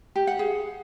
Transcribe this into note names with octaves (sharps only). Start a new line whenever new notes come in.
G4
F#5
G#4